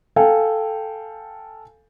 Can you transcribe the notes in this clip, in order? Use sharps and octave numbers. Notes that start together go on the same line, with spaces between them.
A4 F5 G5 G#5